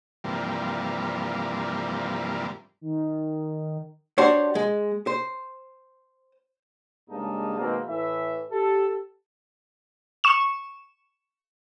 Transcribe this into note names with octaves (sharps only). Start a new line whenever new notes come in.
G2 C3 E3 F3 G3 A#3
D#3
D4 F#4 G4 C5 C#5
G#3
C5
G2 C#3 G#3 A#3 D#4 A5
B2 D#3 G#3 A#3 C4
A2 E3 E5
G4 A4
C#6 E7